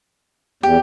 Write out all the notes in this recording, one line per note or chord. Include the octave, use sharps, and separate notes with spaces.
E2 G4